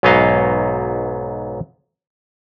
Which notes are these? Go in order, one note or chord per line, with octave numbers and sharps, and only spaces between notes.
B1 G#2 F#3 B3 D#5 F5